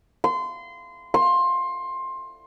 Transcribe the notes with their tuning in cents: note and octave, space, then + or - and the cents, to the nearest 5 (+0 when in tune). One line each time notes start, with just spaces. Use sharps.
C6 -25
C6 +20